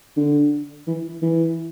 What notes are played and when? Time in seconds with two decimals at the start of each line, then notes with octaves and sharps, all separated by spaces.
0.17 D3
0.87 E3
1.22 E3